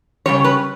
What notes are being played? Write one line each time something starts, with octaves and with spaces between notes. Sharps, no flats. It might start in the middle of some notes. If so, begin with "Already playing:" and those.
C#3 G3 C#4 C#5
B4